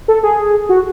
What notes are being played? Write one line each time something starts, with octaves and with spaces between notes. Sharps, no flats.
A4
G#4
F#4